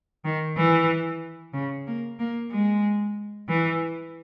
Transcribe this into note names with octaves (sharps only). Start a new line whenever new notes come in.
D#3
E3
C#3
A#3
A#3
G#3
E3